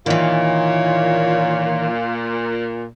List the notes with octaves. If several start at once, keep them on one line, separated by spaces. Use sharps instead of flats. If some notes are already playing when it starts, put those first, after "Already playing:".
A#2 D#3 E3 C#5 F5